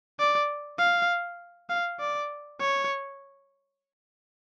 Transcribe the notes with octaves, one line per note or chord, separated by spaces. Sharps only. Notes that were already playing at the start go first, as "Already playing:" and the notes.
D5
F5
F5
D5
C#5